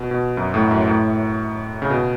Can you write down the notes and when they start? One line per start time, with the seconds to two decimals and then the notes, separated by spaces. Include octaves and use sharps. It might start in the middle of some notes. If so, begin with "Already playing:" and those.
Already playing: B2
0.11 B2
0.37 F#2
0.54 A2
0.71 F#2
0.88 A2
1.82 C#3
1.90 B2